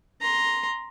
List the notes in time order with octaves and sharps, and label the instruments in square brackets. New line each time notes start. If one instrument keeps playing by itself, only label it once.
[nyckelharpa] A#5 C6